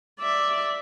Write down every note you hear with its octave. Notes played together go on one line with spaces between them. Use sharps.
D5 E5